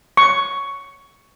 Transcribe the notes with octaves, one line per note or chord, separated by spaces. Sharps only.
C#6